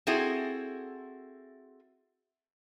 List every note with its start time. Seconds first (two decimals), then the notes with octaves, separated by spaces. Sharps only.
0.07 C4 E4 F#4 G#4 A4